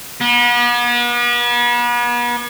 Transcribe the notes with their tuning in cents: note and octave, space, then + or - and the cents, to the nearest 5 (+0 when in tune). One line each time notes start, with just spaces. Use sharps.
B3 -40